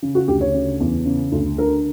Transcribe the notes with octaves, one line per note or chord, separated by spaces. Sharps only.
C#3
F#4
D2 G4
C#5
C#3
E2
C#3
D2
D3 A#4